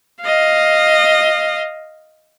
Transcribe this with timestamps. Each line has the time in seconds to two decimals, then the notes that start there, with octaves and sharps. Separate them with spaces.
0.22 D#5 F5